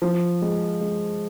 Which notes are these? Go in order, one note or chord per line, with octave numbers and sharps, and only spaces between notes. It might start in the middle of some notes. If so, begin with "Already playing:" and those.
F3
G#3
G#3